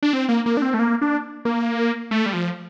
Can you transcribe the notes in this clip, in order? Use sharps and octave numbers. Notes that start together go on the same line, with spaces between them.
D4
C4
A#3
A#3
D4
C4
A3
A#3
D4
A#3
A3
G3
F3